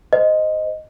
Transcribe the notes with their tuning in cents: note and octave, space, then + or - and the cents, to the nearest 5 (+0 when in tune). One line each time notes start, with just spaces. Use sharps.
C5 -20 D#5 +0